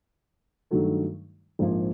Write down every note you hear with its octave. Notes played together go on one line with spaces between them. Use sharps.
G2 D#3 F#3 A3
A#1 G#2 F3 A#3